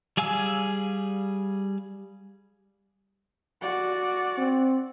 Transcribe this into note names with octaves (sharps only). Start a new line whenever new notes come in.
G3 G#4 F5 G#5 E6
F#4 D5
C4